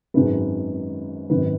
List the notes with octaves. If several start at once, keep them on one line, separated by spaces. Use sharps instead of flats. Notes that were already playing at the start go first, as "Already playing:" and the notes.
G#1 F#2 D#3 G#3 B4
G#1 F#2 D#3 B4